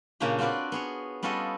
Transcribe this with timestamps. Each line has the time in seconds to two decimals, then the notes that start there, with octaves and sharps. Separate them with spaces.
0.20 A#2 C#3 A#3 C#4 D4 G4
0.39 C4 F4 F#4 B4 D5
0.72 B3 G#4 C#5
1.23 G3 B3 C#4 F4 A4 D#5